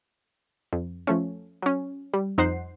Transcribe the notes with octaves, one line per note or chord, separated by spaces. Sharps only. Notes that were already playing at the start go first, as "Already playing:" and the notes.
F2
F3 A3 C#4
F#3 C#4
G3
F2 D#4 C5 F#5 C7